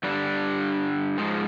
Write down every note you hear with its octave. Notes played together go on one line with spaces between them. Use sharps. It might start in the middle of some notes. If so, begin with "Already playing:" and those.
G2 D3 G3 D4
G#2 F3 G#3